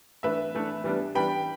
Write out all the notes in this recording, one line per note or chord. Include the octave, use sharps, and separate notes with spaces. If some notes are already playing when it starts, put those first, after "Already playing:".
E3 A3 D4 B4 E5
E3 A3 D4
E3 G3 B3 D4
E3 G3 B3 D4 G5 B5